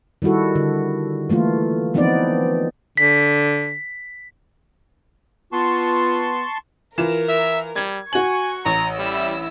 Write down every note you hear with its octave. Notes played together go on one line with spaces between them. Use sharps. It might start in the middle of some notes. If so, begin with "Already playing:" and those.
D#3 G3 E4 F#4 A4
D3
E3 A3 A#3 F4
E3 F3 B3 C4 D#4 D5
D3 B6
B3 F4 A5 C6 C#6
E3 F4 A#4 E7
E5
G3 G#6
F#4 G#5 C#6 F#7
A1 A#5
G3 E4 E6